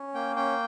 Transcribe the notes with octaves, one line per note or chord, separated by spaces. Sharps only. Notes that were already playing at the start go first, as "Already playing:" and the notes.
Already playing: C#4
A#3 G5
C#4 G5